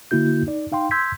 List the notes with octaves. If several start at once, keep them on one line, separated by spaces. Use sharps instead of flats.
D3 A#3 E4 F#4 G6
D#4 D5
D#4 F5 G5 C6
C6 E6 G6 G#6 B6